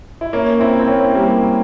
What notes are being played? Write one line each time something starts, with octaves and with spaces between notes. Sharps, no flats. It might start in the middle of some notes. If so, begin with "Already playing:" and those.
E4
A#3 C#4
C4 E4
C4
A#3 C#4
G3 A#3